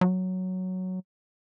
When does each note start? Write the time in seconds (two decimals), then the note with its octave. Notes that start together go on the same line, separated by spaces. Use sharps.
0.01 F#3